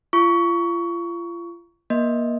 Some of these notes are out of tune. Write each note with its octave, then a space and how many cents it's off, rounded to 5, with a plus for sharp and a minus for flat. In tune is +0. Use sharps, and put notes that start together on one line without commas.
F4 -35 C#6 +20
A#3 +30 D#5 +0